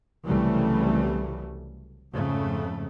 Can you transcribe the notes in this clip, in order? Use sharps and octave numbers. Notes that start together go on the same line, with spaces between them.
C2 C#3 E3 F#3 G3 A3
F2 G#2 C#3 A3